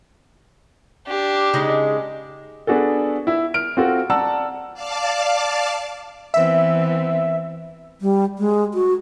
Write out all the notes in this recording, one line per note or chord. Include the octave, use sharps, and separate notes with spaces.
D4 G4
C#3 G#3 D#4
B3 D4 F#4 G#4 A4
E4 E5
F6 D7
C4 F4 F#4 A4
D5 F#5 A5 A#5 E6
D5 F5 A5 D6
E3 B3 C4 E5
G3
G#3
F#4